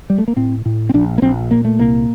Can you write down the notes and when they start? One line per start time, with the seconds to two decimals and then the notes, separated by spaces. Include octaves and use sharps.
0.10 G3
0.18 A3
0.28 A#3
0.36 A2 C4
0.66 A2
0.89 C4
0.94 A#1 D4
1.18 A#3
1.22 A#1 C4
1.51 A#2 A#3
1.65 A3
1.79 C2 A#3